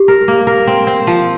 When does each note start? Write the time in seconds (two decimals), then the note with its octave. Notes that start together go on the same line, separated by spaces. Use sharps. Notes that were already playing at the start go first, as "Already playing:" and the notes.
Already playing: G4
0.08 A#4
0.28 A#3
0.47 A#4
0.67 C4
0.87 C4
1.07 F3